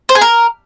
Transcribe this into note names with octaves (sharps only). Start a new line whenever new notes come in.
C5
G#4
A#4